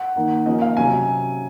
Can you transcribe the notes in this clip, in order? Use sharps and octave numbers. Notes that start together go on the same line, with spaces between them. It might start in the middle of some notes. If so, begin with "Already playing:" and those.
Already playing: F#5
D#3 A#3 D#4
F3 A#3 C#4 D#5
F5
C3 F#3 C#4 G#5